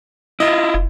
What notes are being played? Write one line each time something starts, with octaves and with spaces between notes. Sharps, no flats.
E4 F4 D#5
F1